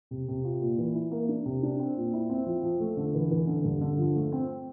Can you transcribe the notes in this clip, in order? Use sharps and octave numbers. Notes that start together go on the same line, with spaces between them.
C3
C3
F4
A#2
E3
E4
A#3
D4
C3
D4
C4
A#2
E4
C4
F3
F3
A3
D3
E3
E3
D3
G2
D3
F3
A3
C4